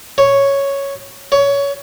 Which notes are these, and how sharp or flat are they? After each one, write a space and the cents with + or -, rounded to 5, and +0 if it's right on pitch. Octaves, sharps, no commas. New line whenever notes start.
C#5 +0
C#5 +20